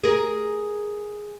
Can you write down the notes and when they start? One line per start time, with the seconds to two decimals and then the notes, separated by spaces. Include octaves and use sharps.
0.04 G#4 A#4